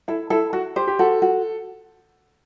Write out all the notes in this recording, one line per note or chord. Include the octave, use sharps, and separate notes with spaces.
E4 A4
E4 A4
F#4 A4
G4 C5
G4
F#4 A4
F#4